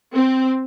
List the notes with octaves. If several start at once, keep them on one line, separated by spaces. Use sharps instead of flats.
C4